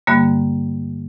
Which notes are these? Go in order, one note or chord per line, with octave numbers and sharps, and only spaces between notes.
G2 D3 G3 A#3